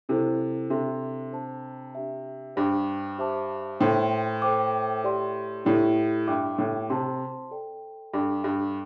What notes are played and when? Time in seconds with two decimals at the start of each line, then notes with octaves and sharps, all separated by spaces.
0.09 C3 E4 A4 C5
0.70 C3 D4 A4 E5 C6
1.32 D4 C5 A5
1.95 D4 G4 E5
2.56 G2 C5 G5 D6
3.18 G4 C5 E5 A5 D6
3.81 A2 C5 G5 C6
4.42 A4 C5 G5 D6
5.04 G4 D5 C6
5.65 A2 E4 G4 D5
6.27 G2 G4 E5 G5 D6
6.58 A2
6.90 C3 C5 A5 C6
7.51 A4 D5 G5
8.13 G2 A4 D5 G5 D6
8.44 G2